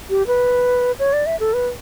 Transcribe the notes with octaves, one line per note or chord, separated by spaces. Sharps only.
G4
B4
C#5
D5
E5
A4
B4